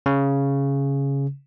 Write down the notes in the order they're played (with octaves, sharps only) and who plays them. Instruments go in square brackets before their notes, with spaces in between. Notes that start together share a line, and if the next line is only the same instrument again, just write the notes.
[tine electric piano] C#3